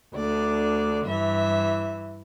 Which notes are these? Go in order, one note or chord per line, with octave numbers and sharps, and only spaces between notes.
D2 D3 D5
G2 E3 E5